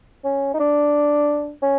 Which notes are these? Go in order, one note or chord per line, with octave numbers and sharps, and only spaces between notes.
C#4
D#4
D4
C#4